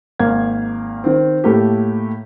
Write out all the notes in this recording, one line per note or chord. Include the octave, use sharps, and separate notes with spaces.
G#1 A#3 F5 G#6
D#3 C4
A2 A3 A#3 G4